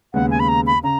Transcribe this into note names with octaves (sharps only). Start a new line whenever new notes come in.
D#2 C#3 G#3 B3 F#5
G#5
B5
A#5
B5
C#3 A#5